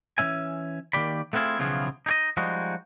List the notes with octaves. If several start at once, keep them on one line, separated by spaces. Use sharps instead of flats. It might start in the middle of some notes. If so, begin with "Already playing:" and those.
E3 G#3 C#4 E5 G#5
D#3 F3 A#3 G4 D5 B5
A3 B3 C4 E4 F4 G#4
B1 C#3 E3 F3 B3 G#4
D#4 G#4 D#5
F3 G3 G#3 D#4 F#4